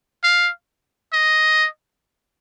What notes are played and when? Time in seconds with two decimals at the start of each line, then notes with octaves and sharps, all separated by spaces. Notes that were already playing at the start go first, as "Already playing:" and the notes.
0.24 F5
1.13 D#5